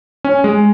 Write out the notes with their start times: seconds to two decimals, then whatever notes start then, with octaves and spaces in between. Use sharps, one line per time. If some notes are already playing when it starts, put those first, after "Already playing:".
0.24 C#4
0.44 G#3